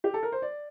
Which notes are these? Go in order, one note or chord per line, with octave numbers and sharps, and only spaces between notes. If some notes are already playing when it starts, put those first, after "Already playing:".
G4
A4
A#4
C5
D5